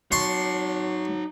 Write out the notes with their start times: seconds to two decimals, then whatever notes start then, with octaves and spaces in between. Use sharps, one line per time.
0.12 F#3 D#4 A5 C6 C#6